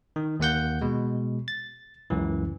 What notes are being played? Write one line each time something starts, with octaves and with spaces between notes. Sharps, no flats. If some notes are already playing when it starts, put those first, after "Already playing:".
D#3
D#2 A#3 F#5 G6
B2 G#3
A6
C#2 F#2 E3